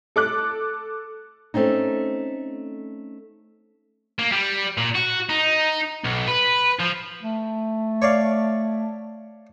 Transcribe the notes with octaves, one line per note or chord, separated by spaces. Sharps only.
A4 D6 F#6
A3 C4 C#4 D#4
A#3
G3
A#2
F#4
D#4
B1
B4
F3
A3
C#5 D5 F5